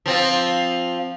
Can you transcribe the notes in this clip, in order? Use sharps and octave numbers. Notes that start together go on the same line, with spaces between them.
F3 C4 F4